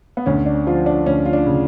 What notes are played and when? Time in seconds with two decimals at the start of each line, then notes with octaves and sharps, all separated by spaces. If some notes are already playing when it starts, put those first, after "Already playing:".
0.17 B3
0.26 D2 C#4
0.46 D4
0.67 F3 F4
0.86 D4
1.06 D2 C#4
1.25 F4
1.33 D4
1.46 C#3